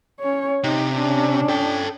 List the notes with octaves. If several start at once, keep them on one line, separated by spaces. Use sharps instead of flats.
C#4 C#5
C3 D#4
C#4 D4
A4 G5